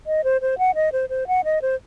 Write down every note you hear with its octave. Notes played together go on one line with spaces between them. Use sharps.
D#5
C5
C5
F#5
D#5
C5
C5
F#5
D#5
C5